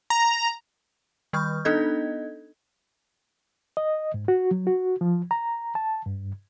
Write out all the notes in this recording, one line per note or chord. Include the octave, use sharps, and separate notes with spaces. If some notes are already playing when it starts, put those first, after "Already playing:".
A#5
D#3 G3 C#6 F6 G6
B3 D4 D#4 A4 D#5 G#6
D#5
G#2
F#4
F#3
F#4
F3
A#5
A5
G2